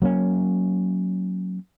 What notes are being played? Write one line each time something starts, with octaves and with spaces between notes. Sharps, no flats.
F#3 A#3 C#4